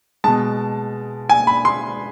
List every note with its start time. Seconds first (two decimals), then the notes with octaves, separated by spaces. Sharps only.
0.24 B2 G#3 A5
1.29 G#5
1.47 B5
1.65 C6